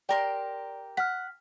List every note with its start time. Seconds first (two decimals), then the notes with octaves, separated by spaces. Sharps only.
0.09 G4 A#4 D5 C6
0.97 F#5 F6 B6